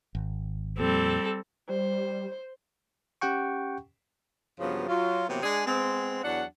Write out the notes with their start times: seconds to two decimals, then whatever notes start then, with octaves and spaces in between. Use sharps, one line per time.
0.15 G#1
0.79 F2 A#2 G3 C4 A4
1.69 G3 C5
3.21 C#4 G4 F#5 G5 C#6
4.60 G2 C#3 F3 F#3 B3
4.88 F#3 F4
5.28 C3 E3 F#3 A#3 B3
5.43 G#3 D4 G#4
5.65 G#3 B3 C4
6.23 E2 F#3 D4 F#5